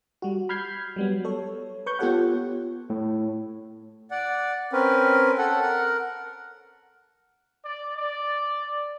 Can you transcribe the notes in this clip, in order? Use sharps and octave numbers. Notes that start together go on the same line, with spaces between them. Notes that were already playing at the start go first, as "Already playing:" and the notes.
G3 F#4
B5 F6 G6 G#6 C7
F#3 G3 B3
A4 C#5
B4 C#6 G6
B3 F4 G4 A4 C#5 F#5
A2
D5 F#5
C4 C#4 A#4 B4
A4 F#5
A#4 F#5
D5
D5